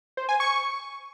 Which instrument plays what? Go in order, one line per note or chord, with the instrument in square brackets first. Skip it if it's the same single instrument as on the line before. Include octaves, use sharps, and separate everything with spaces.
[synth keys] C5
G#5
C#6